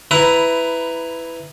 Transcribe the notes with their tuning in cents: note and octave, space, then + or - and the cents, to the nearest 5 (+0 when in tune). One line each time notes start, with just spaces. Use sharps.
E4 +0 B4 +15 A#5 +0